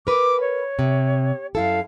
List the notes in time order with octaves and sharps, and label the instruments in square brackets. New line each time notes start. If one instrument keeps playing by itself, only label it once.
[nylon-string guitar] A#4 B4 [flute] D6
[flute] C#5
[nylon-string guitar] C3
[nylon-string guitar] F#2 E4 A4 [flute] F5